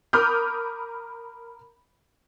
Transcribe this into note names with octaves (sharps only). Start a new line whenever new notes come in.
A#4 B5 D6 D#6 F6 G6